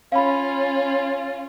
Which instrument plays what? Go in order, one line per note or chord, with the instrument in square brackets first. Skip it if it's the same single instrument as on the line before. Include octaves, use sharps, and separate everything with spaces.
[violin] C#4 F4 [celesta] F5 B5